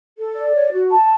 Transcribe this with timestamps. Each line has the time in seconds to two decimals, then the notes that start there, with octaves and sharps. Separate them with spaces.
0.18 A4
0.36 D5
0.54 C#5
0.73 F#4
0.91 A5